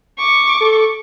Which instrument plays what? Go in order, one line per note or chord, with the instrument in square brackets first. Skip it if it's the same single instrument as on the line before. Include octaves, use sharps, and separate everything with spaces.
[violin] C#6 D6
[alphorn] A4